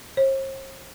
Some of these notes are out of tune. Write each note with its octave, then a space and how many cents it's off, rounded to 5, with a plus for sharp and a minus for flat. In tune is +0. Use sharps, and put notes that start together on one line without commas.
C5 +45